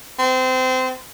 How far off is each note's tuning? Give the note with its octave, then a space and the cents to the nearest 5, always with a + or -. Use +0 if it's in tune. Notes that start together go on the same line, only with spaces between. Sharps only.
C4 -25